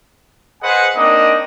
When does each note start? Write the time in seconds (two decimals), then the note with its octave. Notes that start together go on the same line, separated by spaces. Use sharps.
0.62 G#4 B4 C5 D#5 F#5 G#5
0.96 A#3 C4 D4 D#4 D#5